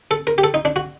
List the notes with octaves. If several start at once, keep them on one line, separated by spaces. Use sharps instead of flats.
A4
A#4
G4
A4
D#4
D4
F#4